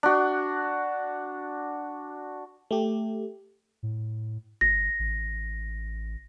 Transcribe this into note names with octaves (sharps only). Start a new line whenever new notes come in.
D4 F#4
A3 G4
A2
G1 A#6
A1